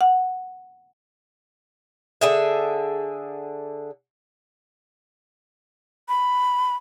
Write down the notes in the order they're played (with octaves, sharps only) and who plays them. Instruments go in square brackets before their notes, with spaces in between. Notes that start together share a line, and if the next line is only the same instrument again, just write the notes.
[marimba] F#5
[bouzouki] D3 G#4 E5
[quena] B5